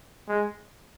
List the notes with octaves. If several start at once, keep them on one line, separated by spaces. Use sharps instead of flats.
G#3